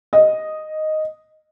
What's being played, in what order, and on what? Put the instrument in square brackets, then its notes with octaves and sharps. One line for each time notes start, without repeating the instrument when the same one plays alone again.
[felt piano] D#5